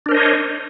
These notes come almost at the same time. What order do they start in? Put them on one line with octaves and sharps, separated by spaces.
D4 A#4 C5 D#5 C#5